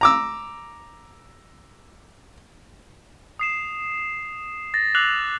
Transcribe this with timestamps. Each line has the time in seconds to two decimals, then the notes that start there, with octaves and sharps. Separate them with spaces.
0.01 A#5 D6 E6
3.39 D#6 C7 E7
4.74 A6 A#6
4.95 D6 E6 F#6 C7 F7 F#7